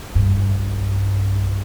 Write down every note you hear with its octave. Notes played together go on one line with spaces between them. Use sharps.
B1 G2